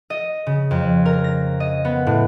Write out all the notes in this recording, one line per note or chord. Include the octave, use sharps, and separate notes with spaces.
D#5
C#3
F2
A#4
A#6
D#5
B3
A2